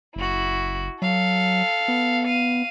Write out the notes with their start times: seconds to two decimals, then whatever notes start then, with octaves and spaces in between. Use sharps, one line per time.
0.16 F#1 E4 F#4
1.02 F#3 A4 F5
1.88 B3
2.25 F5 D#7